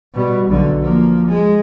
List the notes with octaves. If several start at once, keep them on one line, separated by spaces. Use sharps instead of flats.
B2 G3
B1 D3
F3 A#3
G#3